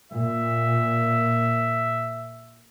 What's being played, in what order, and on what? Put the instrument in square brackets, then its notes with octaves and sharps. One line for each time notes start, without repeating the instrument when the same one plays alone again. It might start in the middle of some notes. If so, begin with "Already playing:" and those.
[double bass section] A#2 [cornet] E5